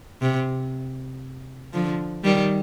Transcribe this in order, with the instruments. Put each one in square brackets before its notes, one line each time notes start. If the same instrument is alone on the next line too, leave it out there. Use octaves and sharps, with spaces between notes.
[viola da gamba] C3
D3 F3
D#3 G3